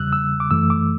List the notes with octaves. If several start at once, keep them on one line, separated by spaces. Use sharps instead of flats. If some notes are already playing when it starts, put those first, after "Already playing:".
Already playing: E2 C#3 G3 E6 F#6
E6
D6
F#2 E3 A3 E6
D6